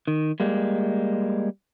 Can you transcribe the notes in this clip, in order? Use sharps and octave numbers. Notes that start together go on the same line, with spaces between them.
D#3
G3 G#3 A#3